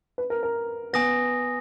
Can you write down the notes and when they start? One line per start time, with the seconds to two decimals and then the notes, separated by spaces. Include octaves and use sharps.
0.18 B4
0.30 A#4
0.43 A#4
0.93 B3 G#5 D#6 A#6